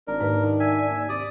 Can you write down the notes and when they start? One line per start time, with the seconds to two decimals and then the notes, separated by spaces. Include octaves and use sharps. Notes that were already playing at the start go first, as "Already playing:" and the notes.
0.07 G#1 D4 A#4
0.21 D#2 G#2 B4
0.43 D#3
0.60 E5 G#5
0.90 D#2
1.09 C3 D5 D#6